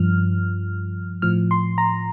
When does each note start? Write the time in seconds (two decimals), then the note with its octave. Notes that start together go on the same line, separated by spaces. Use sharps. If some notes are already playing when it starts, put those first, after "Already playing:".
Already playing: G2 F3 F6
1.22 A2 F3 F6
1.51 C6
1.78 A#5